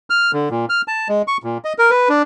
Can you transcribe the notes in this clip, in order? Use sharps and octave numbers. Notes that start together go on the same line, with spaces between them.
F6
D3
A#2
F6
A5
G#3
C#6
A#2
D#5
A#4
B4
D4